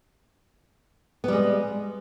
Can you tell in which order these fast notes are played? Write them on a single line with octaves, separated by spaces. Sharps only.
B3 G3 G#3